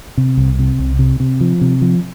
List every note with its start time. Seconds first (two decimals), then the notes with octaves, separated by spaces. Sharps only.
0.17 C3
0.37 C2
0.59 C3
0.79 C2
0.99 C3
1.20 C3
1.41 F3
1.61 C3
1.82 F3